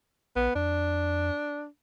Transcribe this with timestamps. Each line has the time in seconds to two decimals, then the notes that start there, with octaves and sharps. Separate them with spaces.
0.36 A#1 B3
0.55 F2 D4